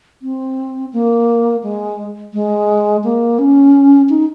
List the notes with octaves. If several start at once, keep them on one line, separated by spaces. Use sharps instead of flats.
C4
A#3
G#3
G#3
A#3
C#4
D#4